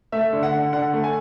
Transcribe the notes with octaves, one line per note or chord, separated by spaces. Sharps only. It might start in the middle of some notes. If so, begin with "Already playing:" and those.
A3 E5
D3
F#5
D3
D3 F#5
A3
G#5